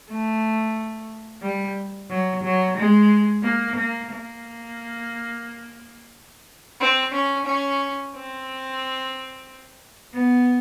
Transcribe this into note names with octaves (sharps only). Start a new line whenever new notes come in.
A3
G3
F#3
F#3
G#3
A#3
A#3
A#3
C4
C#4
C#4
C4
B3